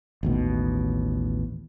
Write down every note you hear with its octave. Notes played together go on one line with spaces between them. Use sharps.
A1 D#2 B2